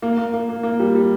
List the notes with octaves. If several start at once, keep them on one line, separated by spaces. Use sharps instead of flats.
A#3
A#3
A#3
A#3
A#3
G3
G3